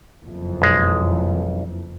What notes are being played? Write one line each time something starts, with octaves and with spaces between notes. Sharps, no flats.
F#1 F2 E3
B1 G#3